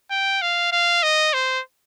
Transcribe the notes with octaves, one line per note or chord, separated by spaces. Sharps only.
G5
F5
F5
D#5
C5